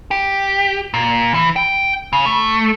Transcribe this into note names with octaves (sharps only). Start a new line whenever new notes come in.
G4
A#2
E3
G5
C#3
A3